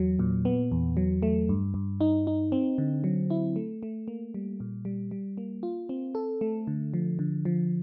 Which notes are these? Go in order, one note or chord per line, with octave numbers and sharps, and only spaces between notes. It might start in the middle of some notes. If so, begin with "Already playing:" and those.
Already playing: E2 F#3
A#2
B3
E2
F#3
A3
G2
G2
D#4
D#4
C4
D3
F#3
E4
A3
A3
A#3
G3
A#2
G3
G3
A#3
F4
C4
A4
A3
D3
F3
D3
F3